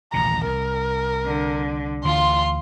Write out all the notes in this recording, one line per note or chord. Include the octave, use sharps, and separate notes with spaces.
D#1 A1 C#3 A#5
C2 A#4
D3
D2 D3 E3 F4 C6